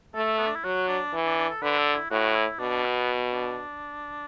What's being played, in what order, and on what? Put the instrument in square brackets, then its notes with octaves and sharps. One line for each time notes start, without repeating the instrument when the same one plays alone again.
[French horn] A3 [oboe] A4
[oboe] B3
D4
E4
[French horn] F#3 [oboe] F#4
[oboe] D4
[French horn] E3
[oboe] D4
D4
A4
[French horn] D3 [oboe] B4
[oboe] A4
E4
[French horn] A2 [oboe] F#4
[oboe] E4
[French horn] B2 [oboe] D4
[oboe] B3
D4